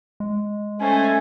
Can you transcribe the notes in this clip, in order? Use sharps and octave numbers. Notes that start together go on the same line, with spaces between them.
G#3
A3 C#4 C5 G#5